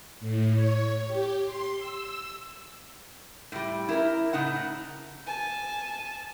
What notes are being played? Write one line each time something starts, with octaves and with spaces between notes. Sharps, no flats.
A2
C#5
G4
C6
E6
A2 G3
E4 A#4
A2 C#3 D#4 F#5 A5
G#5 A5